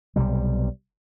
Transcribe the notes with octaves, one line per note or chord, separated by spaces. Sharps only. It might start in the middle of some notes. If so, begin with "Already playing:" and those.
B1 C3 G3